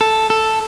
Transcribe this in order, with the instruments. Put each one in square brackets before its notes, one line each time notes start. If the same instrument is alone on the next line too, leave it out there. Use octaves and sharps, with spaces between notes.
[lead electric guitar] A4
A4